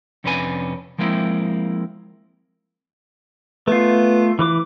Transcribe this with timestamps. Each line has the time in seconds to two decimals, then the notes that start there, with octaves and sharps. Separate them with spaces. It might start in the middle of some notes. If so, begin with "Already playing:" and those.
0.24 F2 C3 C#4 D4 B4 G#5
0.98 F3 G#3 A#3 C4 E4
3.68 A3 B3 F4
4.39 E3 B4 D6